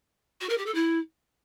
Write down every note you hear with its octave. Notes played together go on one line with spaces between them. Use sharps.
F#4
A#4
G4
A4
E4